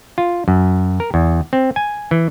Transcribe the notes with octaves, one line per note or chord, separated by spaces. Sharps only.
F4
F#2
A#4
E2
C4
G#5
E3